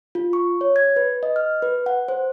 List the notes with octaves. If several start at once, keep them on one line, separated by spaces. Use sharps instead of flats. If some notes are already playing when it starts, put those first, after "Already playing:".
F4
C#6
C#5
G#6
B4
D#5
F6
B4
F#5
C5